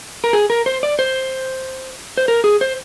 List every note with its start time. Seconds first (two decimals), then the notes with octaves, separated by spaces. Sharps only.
0.24 A#4
0.33 G#4
0.50 A#4
0.66 C5
0.83 D5
0.99 C5
2.17 C5
2.28 A#4
2.44 G#4
2.61 C5